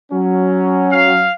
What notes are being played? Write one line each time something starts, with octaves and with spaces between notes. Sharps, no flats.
F#3 C#4
F5